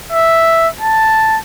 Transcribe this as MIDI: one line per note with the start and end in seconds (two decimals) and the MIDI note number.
0.12 0.68 76
0.81 1.38 81